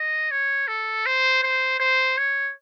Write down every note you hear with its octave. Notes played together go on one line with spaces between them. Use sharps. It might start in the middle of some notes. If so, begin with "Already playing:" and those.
Already playing: D#5
C#5
A4
C5
C5
C5
C#5